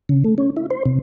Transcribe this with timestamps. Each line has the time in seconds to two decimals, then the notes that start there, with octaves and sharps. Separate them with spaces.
0.09 C#3
0.24 A3
0.38 C#4
0.57 E4
0.70 C5
0.86 C3